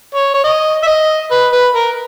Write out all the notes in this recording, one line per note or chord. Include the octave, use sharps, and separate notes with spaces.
C#5
C#5
D#5
E5
D#5
B4
B4
A#4